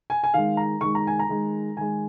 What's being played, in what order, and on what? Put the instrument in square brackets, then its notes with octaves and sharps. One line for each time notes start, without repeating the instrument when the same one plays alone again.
[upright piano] G#5
G#5
D#3 G#3 F5
A#5
D#3 G#3 C#6
A#5
G#5
A#5
D#3 G#3
D#3 G#3 G#5